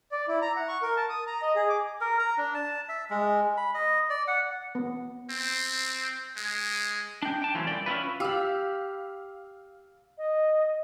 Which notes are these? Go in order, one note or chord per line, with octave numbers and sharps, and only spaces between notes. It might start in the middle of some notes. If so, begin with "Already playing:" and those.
D5
E4
A#5
F#5
C#6
A#4
A5
D#6
A#5
D#5
G#4
D6
A#4
A#5
D4
A5
E5
G#3
B5
D#5
D5
F#5
B3
C4
G#3
D4 G5
G5 A5
E3 F#3 A3 C4 C#4 F4
C2 D5 G5
C#4 E4 F4 B4
G4 F5 B5 E6
D#5